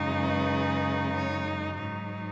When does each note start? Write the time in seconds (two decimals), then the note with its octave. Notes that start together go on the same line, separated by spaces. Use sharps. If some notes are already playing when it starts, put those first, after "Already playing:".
Already playing: F#2 C#3 G#3 D#4
0.17 B4
1.14 C#5
1.78 G#2 F#3 D#4